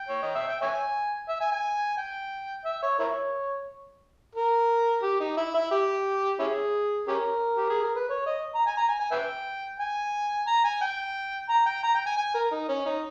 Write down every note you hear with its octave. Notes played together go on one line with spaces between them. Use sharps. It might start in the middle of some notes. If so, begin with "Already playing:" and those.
Already playing: G5
C#5
D#5
E5
G5
C#5 E5 G#5
E5
G#5
G#5
G5
E5
C#5
E4 A#4 C#5
A#4
G4
D#4
E4
E4
G4
C#4 E4 G#4
C#4 G4 A#4
G4
G#4
A#4
B4
C#5
D#5
A#5
G#5
A#5
G#5
G#5
B4 E5 G5
G#5
A#5
G#5
G5
A#5
G5
A#5
G5
G#5
G#5
A#4
D#4
C#4
D#4